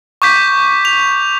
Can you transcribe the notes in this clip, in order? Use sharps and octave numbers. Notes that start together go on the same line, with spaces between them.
C#6 D6 G6 B6
F7